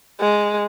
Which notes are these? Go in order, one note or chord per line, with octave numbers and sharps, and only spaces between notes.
G#3